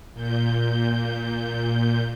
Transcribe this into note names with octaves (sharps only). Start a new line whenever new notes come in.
A#2 G6